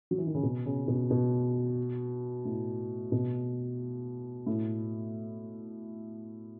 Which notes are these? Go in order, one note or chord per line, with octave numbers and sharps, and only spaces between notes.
F#3
E3
D#3
C#3
B2
C#3
B2
B2
A2
B2
A2